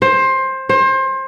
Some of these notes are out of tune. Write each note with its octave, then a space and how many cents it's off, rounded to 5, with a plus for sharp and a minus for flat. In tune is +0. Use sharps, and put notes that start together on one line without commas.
C5 +20
C5 +30